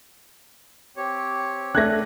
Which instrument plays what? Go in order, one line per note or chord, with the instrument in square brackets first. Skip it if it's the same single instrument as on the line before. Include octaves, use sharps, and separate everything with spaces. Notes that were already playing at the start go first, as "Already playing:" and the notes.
[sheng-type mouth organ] C4 G4 C#5
[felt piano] A3 D4 [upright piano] F#6 G#6 A#6